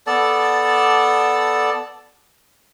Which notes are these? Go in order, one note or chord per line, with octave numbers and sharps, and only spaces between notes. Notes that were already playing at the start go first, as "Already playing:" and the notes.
B3 A4 D5 A5